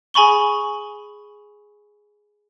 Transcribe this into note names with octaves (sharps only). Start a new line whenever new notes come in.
G#4 G#5 B5 C#6 G7